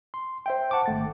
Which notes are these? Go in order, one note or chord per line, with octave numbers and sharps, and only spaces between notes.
C6
C5 E5 G5
F#5 A5 C#6 D6
G#1 A3 A6